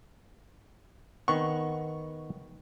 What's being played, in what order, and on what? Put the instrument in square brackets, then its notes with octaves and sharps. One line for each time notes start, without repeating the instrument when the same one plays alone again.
[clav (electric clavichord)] D#3 B3 F#5 [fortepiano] C#6